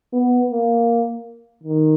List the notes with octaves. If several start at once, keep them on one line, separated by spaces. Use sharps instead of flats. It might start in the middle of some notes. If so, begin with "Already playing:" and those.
B3
A#3
D#3